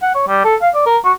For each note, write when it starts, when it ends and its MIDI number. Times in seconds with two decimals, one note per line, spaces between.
0.02 0.10 78
0.14 0.28 73
0.28 0.43 55
0.44 0.55 69
0.61 0.69 77
0.74 0.86 74
0.86 0.97 70
1.04 1.12 66